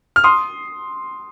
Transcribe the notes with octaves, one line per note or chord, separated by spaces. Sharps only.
F6
C6 D#6